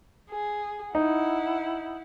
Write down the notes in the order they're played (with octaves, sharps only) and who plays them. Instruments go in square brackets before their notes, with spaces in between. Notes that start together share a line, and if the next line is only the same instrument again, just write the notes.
[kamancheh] G#4
[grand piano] D#4 [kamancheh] E4 F#5